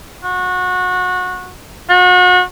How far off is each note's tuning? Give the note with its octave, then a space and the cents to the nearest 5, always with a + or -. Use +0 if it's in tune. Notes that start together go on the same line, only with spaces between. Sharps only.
F#4 -25
F#4 -35